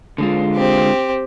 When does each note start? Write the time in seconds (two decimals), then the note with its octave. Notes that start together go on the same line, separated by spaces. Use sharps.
0.18 D3 G#3 F4
0.56 C4 G4